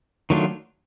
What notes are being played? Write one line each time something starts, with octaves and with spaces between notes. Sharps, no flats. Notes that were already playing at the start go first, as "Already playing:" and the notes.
D#3 F#3 A3 D4 F4